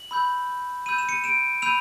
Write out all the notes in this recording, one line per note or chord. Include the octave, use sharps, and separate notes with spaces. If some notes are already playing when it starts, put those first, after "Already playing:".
Already playing: F#7
B5 E6 G6
B5 E6 G6 D#7
E7
C#7 D#7
D7 E7
B5 E6 G6 D#7 F7